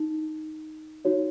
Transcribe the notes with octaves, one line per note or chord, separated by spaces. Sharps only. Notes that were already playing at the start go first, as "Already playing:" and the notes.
Already playing: D#4
D#4 F#4 C#5